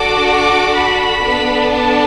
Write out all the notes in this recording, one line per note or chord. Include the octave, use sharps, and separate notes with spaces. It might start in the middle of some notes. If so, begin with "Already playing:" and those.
Already playing: D4 F#4 A4 D6
D6
B5
B3 D4 A4
A5